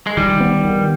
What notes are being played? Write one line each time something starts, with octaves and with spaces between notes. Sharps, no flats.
G#3
D#3 G3
B3
D#3